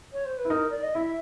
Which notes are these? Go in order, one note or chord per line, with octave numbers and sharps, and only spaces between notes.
C#5
C5
B4
E4
D#4 A#4
D5
D#5
E4 E5